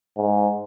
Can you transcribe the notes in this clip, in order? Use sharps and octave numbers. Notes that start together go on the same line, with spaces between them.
G#2